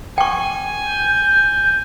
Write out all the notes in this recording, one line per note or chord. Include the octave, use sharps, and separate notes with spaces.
G5 G#5 C#6
G6